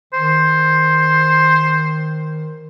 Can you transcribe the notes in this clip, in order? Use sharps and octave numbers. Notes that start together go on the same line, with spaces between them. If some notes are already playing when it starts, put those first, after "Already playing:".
D#3 C5